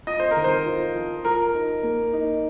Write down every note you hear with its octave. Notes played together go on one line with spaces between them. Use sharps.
F4 D#5
C5
A#4
D#3
C5
F4
F3
F3 A#4
D#4
A#3
D#4